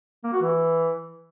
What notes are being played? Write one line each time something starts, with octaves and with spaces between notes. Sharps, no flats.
A#3
F#4
E3